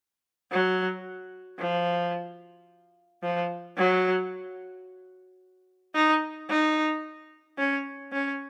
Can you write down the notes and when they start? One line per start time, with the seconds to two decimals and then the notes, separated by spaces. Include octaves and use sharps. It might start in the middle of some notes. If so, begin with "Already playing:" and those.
0.52 F#3
1.59 F3
3.23 F3
3.78 F#3
5.95 D#4
6.50 D#4
7.58 C#4
8.12 C#4